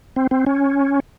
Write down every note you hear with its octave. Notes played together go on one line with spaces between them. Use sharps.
C4
C4
C#4